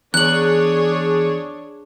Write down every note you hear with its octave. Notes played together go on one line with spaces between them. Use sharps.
E2 D4 G#4 C#5 F#6 F#7